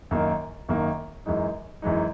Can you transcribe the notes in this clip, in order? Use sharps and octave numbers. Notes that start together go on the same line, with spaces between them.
F#2 D#3 A#3 D#4
F#2 D#3 A#3 D#4
F#2 E3 G#3 D#4
F#2 E3 G#3 D#4